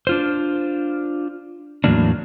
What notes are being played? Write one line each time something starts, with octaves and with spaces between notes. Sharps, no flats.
D4 F4 C5
E2 A2 C3 F#3 A#3 D4